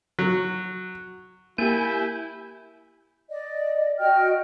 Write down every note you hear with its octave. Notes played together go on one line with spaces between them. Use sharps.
F#3
A#3 E4 G4 G#5 G6
D5 D#5
F#4 D#5 G5 F6